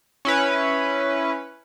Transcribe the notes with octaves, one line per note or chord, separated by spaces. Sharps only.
C#4 E4 B4